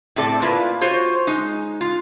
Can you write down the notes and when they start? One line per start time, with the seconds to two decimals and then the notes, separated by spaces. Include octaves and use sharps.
0.16 A2 C4 A4 D5
0.42 A#3 E4 F4 B4
0.81 F4 F#4 C5 C#5
1.27 G#3 D#4
1.81 F4